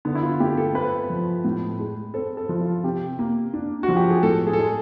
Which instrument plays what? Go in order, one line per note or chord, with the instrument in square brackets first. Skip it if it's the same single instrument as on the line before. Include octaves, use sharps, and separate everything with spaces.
[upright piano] D3 [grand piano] B3
[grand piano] E4
F4
[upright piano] A3 [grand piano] G4
[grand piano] A4
[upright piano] C4 [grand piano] B4
[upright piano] F3
A2
G#3
[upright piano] C4 [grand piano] A4
[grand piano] A4
[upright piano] F3
[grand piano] F4
[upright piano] C3 [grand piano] G4
[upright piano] A#3
D4
[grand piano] F#4
[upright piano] F3
[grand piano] G4
G#4
[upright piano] A2 [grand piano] A4
[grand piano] G#4
A4
[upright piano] G#3 [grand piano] G#4